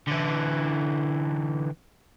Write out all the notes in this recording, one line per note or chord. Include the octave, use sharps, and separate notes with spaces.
D3 E3